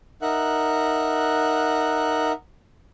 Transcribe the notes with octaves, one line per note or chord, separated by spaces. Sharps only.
D#4 A#4 E5 F#5 F#6